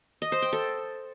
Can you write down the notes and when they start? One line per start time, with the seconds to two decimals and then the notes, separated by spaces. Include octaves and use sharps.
0.22 D#5
0.32 C5
0.42 G5
0.53 A4